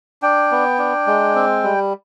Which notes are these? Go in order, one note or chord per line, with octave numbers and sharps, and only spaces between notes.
D4 G5
B3
D4
G#3
C4
G3